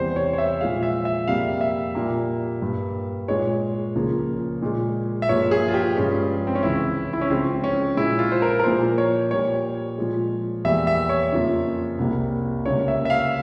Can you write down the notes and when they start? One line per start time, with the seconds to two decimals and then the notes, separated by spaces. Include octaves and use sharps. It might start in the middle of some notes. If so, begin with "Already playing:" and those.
Already playing: E2 C3 G3 C5
0.16 C#5
0.33 C#5
0.38 E5
0.61 A#2 F3 G#3 F5
0.83 E5
1.05 E5
1.28 F2 C3 G3 A#3 F5
1.61 E5
1.95 A#2 G3 A#3
2.62 G2 G3 A#3
3.28 A#2 G#3 C#5
3.95 C#2 C#3 F3 A#3
4.62 A#2 G#3
5.22 E5
5.29 G2 F3 A#3 C#5
5.51 G#4
5.68 F4
5.74 G4
5.96 G2 F3 G#3 C#4
6.47 C4
6.55 C#4
6.63 C#2 C3 E3 E4
7.13 E4
7.21 C#4
7.30 C#2 C#3 F3 G#3 C4
7.64 C#4
7.97 A#2 G#3 E4
8.19 F4
8.32 C5
8.42 A#4
8.60 A#4
8.64 A#2 F3 A#3 C5
8.98 C#5
9.31 A#2 G3 A#3 C#5
9.98 A#2 F3 G#3
10.64 E2 E3 G3 A#3 E5
10.87 E5
11.09 C#5
11.32 F2 C#3 F3 A#3
11.99 C2 C3 G3 A#3
12.66 C#2 C#3 G3 A#3 C#5
12.88 E5
13.05 E5
13.10 F5